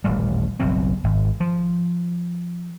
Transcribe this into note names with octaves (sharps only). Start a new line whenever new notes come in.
D#1 A1 G3
F#1 B1 B2 C4
G#1
F3